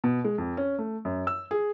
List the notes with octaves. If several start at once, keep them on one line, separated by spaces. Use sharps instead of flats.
B2
G#3
F2
C#4
A3
F#2
E6
G#4